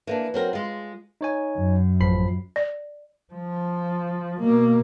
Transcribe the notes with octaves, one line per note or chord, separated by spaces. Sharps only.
E3 A#3 D4
F#3 C4 A#4
G#3 F4
D#4 C#5 G#5
F#2
A1 F3 B5 C7
D5
F3
B2 A#3